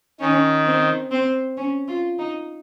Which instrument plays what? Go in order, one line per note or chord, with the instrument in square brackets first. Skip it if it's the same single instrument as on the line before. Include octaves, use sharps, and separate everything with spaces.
[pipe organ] D#3 [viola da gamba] C#4
[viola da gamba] C4
C4
C#4
F4
D#4